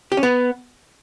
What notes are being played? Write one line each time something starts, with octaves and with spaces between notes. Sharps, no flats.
G4
C#4
B3